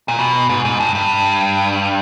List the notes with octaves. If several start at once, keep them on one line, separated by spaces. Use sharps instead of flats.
A#2
B2
G#2
G#2
G2
G2